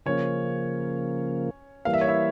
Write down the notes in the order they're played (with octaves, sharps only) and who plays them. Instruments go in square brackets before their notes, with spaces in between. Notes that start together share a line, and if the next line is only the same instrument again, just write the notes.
[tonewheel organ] C#3 F3 A#3 [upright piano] C#4 C#5
[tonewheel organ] E3 G3 A#3 [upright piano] F5
[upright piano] E5
C#5
E4 E5